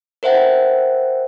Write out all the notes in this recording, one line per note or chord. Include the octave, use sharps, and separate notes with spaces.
A#4 C5 E5 F#5 G5